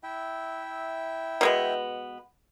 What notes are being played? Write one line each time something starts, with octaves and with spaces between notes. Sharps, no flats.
E4 E5 G5
B2 G#3 B3